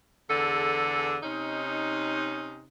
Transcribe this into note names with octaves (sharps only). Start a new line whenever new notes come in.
E2 D3 G#4 A4
C3 C#4 D#4